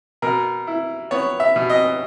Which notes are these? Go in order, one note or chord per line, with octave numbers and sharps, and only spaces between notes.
B2 A#4
E4
B3 C#5
E5
B2
D#5